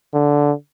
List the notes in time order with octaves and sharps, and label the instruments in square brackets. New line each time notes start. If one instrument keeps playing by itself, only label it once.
[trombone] D3